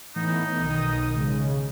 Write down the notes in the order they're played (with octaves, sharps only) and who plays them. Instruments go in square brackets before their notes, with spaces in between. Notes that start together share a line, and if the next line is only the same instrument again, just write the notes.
[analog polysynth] A2 E3 B3 [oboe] D#4
[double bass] B1 D#3 [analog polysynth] D#6
[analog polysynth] C#3 G#3